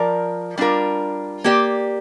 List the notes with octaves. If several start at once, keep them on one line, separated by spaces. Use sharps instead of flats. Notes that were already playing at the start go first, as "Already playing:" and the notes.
Already playing: F3 A#4 D5
G3 D4 F4 A#4
A#3 G4 D5